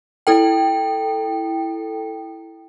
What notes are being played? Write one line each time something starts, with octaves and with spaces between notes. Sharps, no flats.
E4 A4 G5